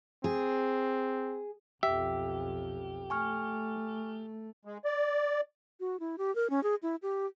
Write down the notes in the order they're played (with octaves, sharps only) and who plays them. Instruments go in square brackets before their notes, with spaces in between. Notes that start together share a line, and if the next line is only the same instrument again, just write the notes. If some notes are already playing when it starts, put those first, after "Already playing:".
[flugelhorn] C4 [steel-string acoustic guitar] G#4
[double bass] B1 F2 [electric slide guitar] G4 [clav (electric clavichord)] E5
[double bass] A3 [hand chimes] G#5 C#6 F6
[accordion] G#3
D5
[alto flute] F#4
E4
G4
A#4
C#4
G#4
E4
G4